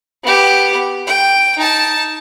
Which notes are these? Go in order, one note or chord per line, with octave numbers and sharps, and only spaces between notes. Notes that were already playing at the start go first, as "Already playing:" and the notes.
B3 G4
G5
D#4 A5